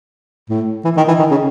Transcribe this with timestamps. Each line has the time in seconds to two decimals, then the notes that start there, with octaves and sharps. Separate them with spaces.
0.50 A2
0.85 E3
0.97 D#3
1.08 E3
1.19 D#3
1.31 C#3